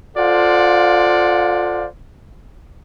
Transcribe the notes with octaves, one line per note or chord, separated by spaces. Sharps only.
F4 A4 C5 D5 F5 F#5